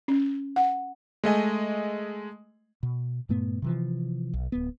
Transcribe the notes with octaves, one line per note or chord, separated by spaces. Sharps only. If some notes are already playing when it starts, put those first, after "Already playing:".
C#4
F#5
G#3 A3 D#5 G#5
B2
G2 A#2 A3 B3
C3 E3 F3
B1
D1 B3